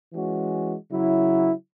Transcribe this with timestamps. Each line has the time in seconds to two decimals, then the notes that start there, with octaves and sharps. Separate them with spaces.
0.13 E3 G#3 C#4 F#4
0.90 C#3 F#3 E4